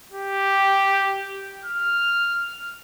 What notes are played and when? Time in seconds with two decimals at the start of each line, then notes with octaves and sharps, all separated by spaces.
0.13 G4
1.65 F6